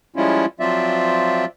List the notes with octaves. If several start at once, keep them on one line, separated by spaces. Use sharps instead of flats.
F3 G3 G#3 C#4 E4 F4
F3 F#3 C4 F4 D5 E5